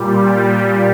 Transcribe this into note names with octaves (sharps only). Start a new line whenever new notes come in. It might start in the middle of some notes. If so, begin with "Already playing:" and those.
Already playing: A#2 G3